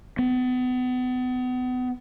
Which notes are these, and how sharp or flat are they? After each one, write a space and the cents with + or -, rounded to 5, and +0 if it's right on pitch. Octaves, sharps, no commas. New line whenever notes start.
B3 +35